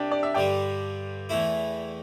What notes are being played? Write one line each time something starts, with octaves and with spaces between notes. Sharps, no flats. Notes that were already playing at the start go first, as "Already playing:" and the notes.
Already playing: C2 C3 G3 D4 G4
D5
E5
G2 D3 G3 D5 G5
E2 E3 A3 E4